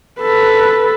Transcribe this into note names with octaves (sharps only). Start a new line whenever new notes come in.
A4 B4